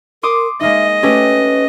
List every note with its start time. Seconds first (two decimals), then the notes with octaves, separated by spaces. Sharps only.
0.23 A#4 C6 D6 D#6
0.61 G#3 A#3 D#4 D#5 E5
1.03 A3 C#4 G4 B4